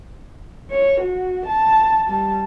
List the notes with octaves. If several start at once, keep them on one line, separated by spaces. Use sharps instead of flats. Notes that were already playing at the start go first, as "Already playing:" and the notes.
C#5
F#4
A5
G3 A5